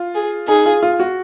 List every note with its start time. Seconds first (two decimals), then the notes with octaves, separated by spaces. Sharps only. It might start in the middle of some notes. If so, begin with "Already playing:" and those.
Already playing: F4
0.15 G#4
0.48 D#4 G#4
0.66 F4
0.83 F4
1.00 F#4